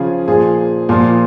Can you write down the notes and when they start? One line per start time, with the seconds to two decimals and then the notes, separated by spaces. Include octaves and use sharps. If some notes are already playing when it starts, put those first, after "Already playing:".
Already playing: C#3 F3 G#4
0.28 A#2 F3 G#4
0.89 A#2 F3